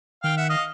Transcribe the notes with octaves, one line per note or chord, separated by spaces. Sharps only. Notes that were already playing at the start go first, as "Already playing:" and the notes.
D#3 F5 G5
E5 F#5
D#5 F5